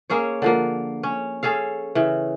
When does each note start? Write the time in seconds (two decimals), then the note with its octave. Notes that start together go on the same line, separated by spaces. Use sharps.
0.10 A#3 C#4 G#4 C#5
0.42 D3 F3 A#3
1.03 C#4
1.43 C#4 G#4 A4 F5
1.95 C#3 E3